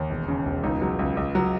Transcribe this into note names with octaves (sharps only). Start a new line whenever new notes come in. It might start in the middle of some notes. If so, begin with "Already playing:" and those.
Already playing: D#2
E1
C#3
E1
C#2 D#4
F#3
C#2
C#2
F#3